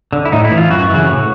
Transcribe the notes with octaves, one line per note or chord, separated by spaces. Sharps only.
D3
E4
A2 D#4
E4
E3
F4
F#2 F#4
C#3 E3
A2